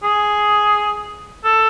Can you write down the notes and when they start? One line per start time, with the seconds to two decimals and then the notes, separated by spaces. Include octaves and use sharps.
0.03 G#4
1.44 A4